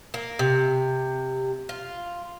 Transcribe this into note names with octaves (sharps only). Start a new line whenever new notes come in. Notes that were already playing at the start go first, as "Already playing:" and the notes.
A#3
C3
F4